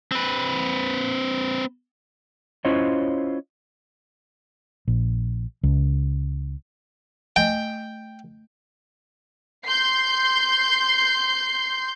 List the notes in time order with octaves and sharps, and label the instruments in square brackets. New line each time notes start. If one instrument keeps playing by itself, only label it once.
[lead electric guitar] C4 B4
[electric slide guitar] C#4 E4 F4 C5 C#5 D#5
[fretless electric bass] A#1
C#2
[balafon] A3 D#5 [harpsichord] G5
[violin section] C6 G6 C7